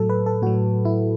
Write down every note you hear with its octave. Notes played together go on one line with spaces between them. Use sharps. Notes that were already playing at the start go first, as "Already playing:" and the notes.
Already playing: A2 F#3 A4
B4
A4
A2 F#3 F#4
E4